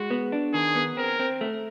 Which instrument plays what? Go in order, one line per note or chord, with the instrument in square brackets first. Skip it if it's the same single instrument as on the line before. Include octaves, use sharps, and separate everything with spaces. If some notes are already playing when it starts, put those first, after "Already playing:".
Already playing: [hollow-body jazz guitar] G#3 [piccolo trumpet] F#4
[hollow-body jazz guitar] B3
D4
[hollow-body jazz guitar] D#3 [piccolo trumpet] G#4
[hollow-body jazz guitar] B3
[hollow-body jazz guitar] C4 [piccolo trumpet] A#4
[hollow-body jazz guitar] C4
A3